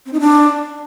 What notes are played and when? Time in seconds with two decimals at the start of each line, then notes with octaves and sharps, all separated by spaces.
0.06 C4
0.13 D#4
0.20 D4